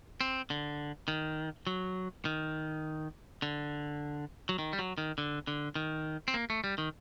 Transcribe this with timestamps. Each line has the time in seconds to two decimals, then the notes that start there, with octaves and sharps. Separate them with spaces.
0.21 C4
0.50 D3
1.08 D#3
1.67 F#3
2.25 D#3
3.42 D3
4.49 F#3
4.59 D#3
4.73 G3
4.79 F#3
4.98 D#3
5.18 D3
5.47 D3
5.75 D#3
6.28 C4
6.34 A#3
6.50 A3
6.64 G3
6.78 D#3